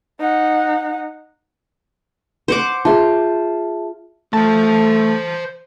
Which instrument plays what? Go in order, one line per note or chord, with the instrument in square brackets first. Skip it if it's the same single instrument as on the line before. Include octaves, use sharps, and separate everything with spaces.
[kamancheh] D#4 F#5
[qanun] C5 F#5 D6
[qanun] F4 [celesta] G#4 E5 A5
[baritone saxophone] A3 [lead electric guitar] C5 A5